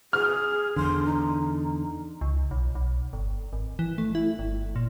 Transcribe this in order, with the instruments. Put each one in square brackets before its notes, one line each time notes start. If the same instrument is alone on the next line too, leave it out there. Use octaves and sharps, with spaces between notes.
[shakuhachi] G#4 [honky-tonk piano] F6
[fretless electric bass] E2 D3 [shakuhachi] C6
[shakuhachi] D#4
[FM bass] C#2
B1
B1
G1
G#1
E3
A3
E4
G1
A#2